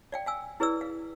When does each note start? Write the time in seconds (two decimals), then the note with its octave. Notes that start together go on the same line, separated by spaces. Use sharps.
0.12 D5 F5 G5
0.26 F5 G#5 E6
0.60 E4 G#4 B4 D5 E6
0.81 F5